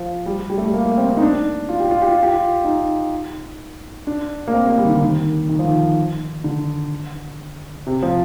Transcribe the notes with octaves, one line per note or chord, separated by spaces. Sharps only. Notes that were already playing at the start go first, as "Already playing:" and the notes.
Already playing: F3
G3
G3
A3
G3
A#3
A#3
C4
C4
D#4
D4
F4
G4
F4
G4
F4
G4
F4
D#4
D4
A#3
C4
A#3
G3
D#3
D3
D#3
D#3
F3
D#3
D3
C3
F3